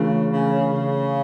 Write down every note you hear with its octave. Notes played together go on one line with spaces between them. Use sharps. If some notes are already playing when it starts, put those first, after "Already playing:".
Already playing: C#3 E3 A3 D4 F4 A#4
C#3
C#3